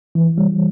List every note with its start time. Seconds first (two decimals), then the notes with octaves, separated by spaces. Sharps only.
0.15 E3
0.38 G3